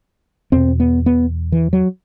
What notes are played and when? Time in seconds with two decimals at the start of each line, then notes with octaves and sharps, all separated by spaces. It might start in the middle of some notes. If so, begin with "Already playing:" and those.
0.52 E2 B2 C4
0.80 B3
1.06 B3
1.52 E3
1.73 F#3